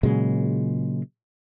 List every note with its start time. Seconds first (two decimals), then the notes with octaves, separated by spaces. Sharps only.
0.03 A#2 C#3 F#3 G#3